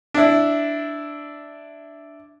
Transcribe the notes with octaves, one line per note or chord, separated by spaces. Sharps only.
D4 E4